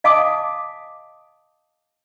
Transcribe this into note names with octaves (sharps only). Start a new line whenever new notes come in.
D#5 F5 G#5 A5 D6 D#6